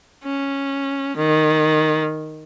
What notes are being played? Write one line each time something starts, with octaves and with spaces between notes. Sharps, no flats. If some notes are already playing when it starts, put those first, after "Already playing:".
C#4
D#3